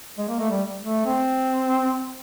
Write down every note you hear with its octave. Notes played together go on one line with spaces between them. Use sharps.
G#3
A#3
A3
G3
A3
C4